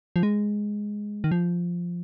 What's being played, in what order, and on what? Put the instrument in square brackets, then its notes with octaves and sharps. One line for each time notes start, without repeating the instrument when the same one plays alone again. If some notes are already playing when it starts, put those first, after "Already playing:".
[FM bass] F3
G#3
D#3
F3